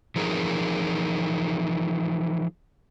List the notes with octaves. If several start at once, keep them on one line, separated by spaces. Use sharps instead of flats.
E3 F3 D#4 G#4 A#4